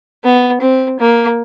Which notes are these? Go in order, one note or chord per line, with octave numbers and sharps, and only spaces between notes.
B3
C4
A#3